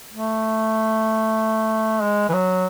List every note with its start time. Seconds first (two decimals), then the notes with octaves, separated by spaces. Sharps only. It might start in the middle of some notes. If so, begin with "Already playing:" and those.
0.13 A3
2.02 G#3
2.29 E3
2.33 F#3